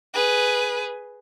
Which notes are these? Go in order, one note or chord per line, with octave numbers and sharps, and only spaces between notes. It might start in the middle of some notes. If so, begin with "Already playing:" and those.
G#4 B4